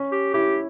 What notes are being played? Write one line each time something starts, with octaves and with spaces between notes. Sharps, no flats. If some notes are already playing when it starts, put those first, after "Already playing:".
Already playing: C#4
G4
E4 G4